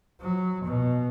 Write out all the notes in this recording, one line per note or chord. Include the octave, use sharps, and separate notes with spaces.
F#3
B2